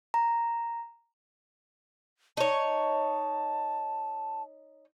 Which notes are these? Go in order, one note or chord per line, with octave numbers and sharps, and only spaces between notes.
A#5
D#4 C#5 A5